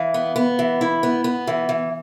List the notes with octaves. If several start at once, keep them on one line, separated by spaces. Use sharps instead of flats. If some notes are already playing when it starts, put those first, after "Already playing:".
Already playing: E3 F5
B3
B3
E3
E4
B3
B3
E3
E3